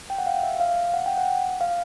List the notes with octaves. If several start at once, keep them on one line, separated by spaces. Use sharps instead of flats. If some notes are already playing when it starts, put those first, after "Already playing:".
G5
F#5
F5
E5
F5
F#5
G5
F#5
F5